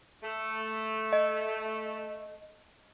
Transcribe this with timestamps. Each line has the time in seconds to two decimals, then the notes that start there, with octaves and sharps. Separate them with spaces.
0.23 A3
1.13 D#5